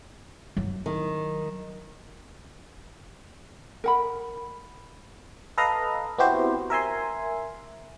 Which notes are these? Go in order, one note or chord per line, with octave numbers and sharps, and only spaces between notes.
F#3
D#3
A#4 F#5 B5
A4 B4 D#5 F5 A#5
B3 C4 E4 F#4 G4 C5
A#4 E5 G#5 C6